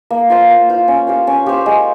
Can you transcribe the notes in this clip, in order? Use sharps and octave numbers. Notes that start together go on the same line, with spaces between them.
A#3
F4 C5 F5
A#3
F4 C5 F5
C#4
G4 C5 F5
C#4
G4 C5 F5
G#3